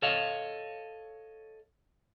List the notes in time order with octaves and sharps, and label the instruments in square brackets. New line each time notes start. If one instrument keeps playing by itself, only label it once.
[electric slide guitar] A4 C#5 D#5 F5